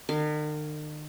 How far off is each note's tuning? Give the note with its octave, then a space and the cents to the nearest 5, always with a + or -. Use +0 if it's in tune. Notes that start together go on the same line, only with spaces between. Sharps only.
D#3 -45 F5 +0